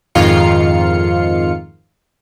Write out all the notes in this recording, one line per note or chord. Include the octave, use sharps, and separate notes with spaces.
F2 G#2 D#3 F4 F5 C#7